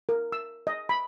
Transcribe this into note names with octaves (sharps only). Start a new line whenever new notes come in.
A#4
E6
D#5
B5